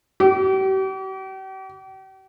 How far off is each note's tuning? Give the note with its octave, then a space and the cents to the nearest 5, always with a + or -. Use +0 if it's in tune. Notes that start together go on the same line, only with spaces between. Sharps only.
G4 -40